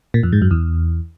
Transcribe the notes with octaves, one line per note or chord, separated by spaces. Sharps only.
A#2
F2
G#2
F#2
E2